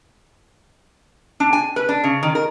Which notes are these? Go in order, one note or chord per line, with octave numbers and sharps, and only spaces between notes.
D4
G#5
B4
D4
C#3
D#3
A#4